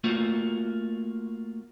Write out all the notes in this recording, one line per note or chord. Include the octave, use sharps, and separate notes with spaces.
A3 A#3 F4 F#4